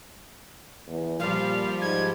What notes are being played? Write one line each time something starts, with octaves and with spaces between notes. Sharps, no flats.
E2
A#2 F3 G3 F5
G#2 G#6